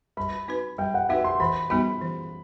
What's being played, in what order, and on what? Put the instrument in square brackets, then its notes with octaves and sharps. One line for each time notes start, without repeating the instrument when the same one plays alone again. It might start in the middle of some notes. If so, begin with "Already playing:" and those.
[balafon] G3 [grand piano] B5
[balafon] C4 D#4 F#4 B4
[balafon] G3 [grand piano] G5
[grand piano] F#5
[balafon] C4 D#4 F#4 B4 [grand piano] E5
[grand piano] C6
[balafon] E3 [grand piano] B5
[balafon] G3 B3 D#4 F#4 [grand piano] B5
[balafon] E3